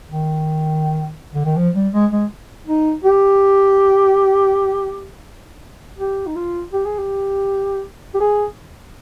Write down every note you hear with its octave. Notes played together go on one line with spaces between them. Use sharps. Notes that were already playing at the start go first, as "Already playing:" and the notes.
D#3
D3
D#3
F3
G3
G#3
G#3
D#4
G4
G4
D#4
F4
G4
G#4
G4
G4
G#4